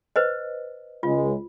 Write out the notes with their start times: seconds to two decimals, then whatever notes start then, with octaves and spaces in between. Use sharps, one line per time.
0.16 B4 C5 D#5
1.03 C#2 G#3 F4